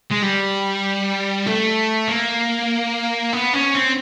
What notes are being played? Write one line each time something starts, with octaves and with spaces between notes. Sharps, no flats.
G#3
G3
A3
A#3
B3
C#4
C4